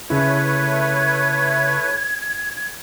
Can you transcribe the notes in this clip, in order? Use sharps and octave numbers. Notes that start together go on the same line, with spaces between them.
C#3 A3 E4 B4 C#5 G#6